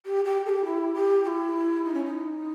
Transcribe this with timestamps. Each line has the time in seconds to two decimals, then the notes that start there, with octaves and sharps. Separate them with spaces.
0.05 G4
0.25 G4
0.46 A4
0.49 G4
0.65 E4
0.94 G4
1.23 G4
1.27 E4
1.84 D#4
1.94 C#4
2.05 D#4